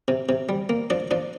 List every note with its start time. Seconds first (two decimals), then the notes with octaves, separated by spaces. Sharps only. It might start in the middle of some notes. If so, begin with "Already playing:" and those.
0.08 C3
0.29 C3
0.49 G3
0.69 A#3
0.90 F3 D4 D5
1.11 F3 D4 D5